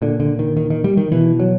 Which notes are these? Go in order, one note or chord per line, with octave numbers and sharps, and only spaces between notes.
A#2 D3
D3
D#3
D#3
D#3
G3
D#3
B2 E3
F#3